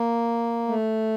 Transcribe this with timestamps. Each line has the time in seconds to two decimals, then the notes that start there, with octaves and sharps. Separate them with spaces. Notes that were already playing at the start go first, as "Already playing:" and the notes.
Already playing: A#3
0.68 A3